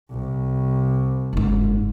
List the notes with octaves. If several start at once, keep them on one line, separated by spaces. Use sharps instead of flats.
C2
F#1 G#2